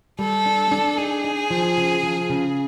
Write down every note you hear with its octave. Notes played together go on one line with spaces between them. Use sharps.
G3 A4
D4
D4
D#4 G#4
D#4
F3
C#3
F3
C#3